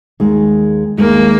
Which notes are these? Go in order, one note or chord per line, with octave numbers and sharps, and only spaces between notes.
D#2 D#3 G#3
D#2 D#3 G#3 A#3